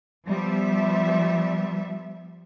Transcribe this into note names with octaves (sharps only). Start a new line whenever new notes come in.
F3 G3 B3 E5